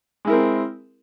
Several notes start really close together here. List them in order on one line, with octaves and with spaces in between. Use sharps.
G#3 E4 A#4 C4